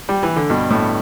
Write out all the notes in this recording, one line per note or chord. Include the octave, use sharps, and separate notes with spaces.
G3
E3
D3
G2 B2
A2